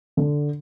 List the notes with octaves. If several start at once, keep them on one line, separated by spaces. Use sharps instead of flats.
D3